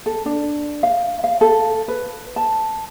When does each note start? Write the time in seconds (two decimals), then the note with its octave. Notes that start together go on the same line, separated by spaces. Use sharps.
0.06 A4
0.26 D4
0.83 F5
1.24 F5
1.41 A4
1.88 B4
2.36 A5